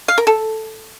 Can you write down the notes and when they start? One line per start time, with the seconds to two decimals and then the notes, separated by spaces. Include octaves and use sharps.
0.08 F5
0.18 A#4
0.27 A4